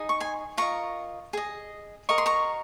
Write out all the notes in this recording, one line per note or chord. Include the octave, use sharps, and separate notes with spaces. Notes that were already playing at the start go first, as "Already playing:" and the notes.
Already playing: D#4 G#4 D#5
C#6
G#5 C6
F4 A#4 D#5 A#5 C#6
G#4 D#5
F#4 A#4 D#5 C#6
C6
A#5 C#6